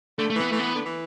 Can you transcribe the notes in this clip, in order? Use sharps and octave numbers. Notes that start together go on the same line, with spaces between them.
D3 A3
A3
E3 B3
E3 A3
B3
D3
E3